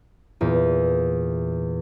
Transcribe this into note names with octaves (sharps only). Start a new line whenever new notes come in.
E2 A#2